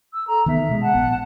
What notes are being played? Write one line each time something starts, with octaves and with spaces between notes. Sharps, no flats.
E6
A4 A#5
D#3 B3 E5
B2 G#3
F#5 A5
A#1 B3